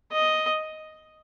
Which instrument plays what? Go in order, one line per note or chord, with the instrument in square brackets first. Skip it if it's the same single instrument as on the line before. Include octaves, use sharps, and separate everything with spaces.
[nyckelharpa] D#5